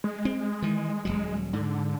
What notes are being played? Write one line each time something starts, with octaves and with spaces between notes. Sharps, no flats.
G#3
C4
D#3 E3
D#1 A#1 F#3
G#2 D3